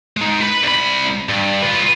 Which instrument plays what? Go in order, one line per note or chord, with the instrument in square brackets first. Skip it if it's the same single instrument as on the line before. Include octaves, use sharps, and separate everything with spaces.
[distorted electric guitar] G#3 D#4
B4 B5
C2 B5
G2
F4 B4